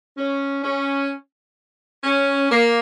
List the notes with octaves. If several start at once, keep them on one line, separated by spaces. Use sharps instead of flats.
C#4
C#4
C#4
A#3